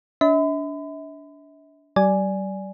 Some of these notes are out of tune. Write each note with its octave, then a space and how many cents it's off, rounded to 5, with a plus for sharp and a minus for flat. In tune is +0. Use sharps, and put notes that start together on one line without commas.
D4 -30 E5 -40 B5 +40
G3 -40 D5 +0 G#5 +0